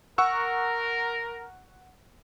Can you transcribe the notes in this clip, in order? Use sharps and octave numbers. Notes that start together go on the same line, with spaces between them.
A#4 F#5 C#6 E6